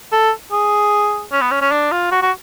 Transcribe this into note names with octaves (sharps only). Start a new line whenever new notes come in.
A4
G#4
C#4
B3
C#4
C#4
D4
F4
F#4
F#4